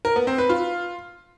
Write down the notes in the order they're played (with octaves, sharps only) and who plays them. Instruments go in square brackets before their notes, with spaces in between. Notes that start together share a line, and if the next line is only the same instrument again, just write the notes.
[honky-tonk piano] A#4
B3
C4
B4
F4